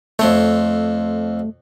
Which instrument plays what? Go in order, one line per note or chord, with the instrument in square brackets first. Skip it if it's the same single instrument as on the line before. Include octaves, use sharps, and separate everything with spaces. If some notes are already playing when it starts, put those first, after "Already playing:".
[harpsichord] F2 C4 C#5 [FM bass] A3